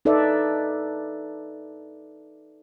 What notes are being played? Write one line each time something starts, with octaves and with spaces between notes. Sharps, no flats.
D#4 A4 B4 D5 E5